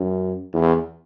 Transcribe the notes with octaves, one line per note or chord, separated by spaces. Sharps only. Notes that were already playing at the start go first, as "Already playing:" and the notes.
Already playing: F#2
E2